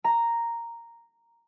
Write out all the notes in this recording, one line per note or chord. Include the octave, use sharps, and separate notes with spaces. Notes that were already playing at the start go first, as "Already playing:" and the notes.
A#5